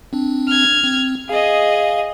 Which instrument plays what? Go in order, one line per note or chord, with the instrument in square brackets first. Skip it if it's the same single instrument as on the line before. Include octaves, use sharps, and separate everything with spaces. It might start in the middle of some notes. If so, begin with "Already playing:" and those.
[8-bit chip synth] C4 D4
[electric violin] F6 G#6
[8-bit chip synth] C4
[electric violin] G#4 D#5 [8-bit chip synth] F5